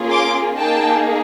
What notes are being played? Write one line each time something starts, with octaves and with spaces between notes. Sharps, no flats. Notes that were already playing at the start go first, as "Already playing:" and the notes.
Already playing: A#3 C#4 F4 G#4
C6 D6
A#3 D#4 G#4 G5 A5